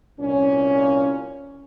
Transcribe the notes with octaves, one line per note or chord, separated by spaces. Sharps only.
C2 A#2 A#3 C#4